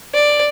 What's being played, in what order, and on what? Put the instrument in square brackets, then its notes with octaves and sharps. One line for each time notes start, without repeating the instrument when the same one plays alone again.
[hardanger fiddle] D5